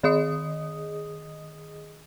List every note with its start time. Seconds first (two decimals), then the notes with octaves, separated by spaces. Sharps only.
0.03 D#3 G#4 D#5 D#6